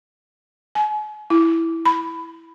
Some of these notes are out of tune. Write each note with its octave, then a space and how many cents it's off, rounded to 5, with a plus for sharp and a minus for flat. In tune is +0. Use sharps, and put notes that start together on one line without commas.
G#5 +40
E4 +0
B5 +15